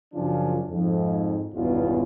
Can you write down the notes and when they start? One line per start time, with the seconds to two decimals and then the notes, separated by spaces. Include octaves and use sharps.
0.14 F#2 C#3 F3 C#4 D4 F4
0.70 F2 G#2
1.54 G#1 E2 G2 B2 C#4 F4